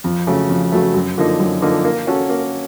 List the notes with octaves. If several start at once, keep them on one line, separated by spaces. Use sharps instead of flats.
F2
C#3 F#3 A3
F2
C#3 F#3 A3
F#2
D3 F3 A#3 D#4
F#2
D3 F3 A#3 D#4
A#3
C#4 F#4 A4
A#3